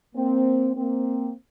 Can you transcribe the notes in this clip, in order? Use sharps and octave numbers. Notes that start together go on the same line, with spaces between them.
A#3 C4
A#3 C4